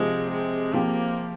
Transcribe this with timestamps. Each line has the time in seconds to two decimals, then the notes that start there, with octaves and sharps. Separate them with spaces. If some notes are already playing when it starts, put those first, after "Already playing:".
Already playing: C3 F3 G#3 C4
0.31 G#3
0.73 F3 A#3 C4 G4